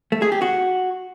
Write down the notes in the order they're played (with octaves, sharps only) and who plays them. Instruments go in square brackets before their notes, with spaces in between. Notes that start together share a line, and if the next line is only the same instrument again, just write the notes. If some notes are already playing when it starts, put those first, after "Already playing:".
[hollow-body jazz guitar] A3
G#4
G4
F#4